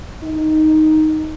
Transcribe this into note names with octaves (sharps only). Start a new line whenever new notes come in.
D#4